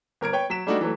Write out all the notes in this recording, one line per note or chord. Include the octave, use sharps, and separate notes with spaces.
G1 A#4 G#6 D7
B4 C#5 G5
F#3 B6 E7
G3 A3 D4 D#4 F#4
E3 F#3 A3